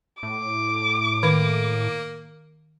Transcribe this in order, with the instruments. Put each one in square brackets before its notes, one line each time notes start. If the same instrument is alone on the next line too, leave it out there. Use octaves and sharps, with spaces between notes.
[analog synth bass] A2 [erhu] D6
[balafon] D#3 [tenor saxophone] A#3